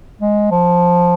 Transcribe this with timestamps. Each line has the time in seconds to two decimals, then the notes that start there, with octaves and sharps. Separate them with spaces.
0.21 G#3
0.51 F3